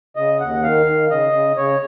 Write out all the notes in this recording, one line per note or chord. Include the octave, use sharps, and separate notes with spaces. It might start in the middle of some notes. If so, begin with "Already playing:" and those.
C#3 D#5
D#2 F#5
D#3 F5
D#3
C#3 D#5
C#3
C#3 C#5